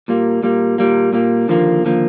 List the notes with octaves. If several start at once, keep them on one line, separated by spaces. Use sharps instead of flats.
A#2 G3 A#3
A#2 G3 A#3
A#2 G3 A#3
A#2 G3 A#3
D#2 D3 F3 A#3
D#2 D3 F3 A#3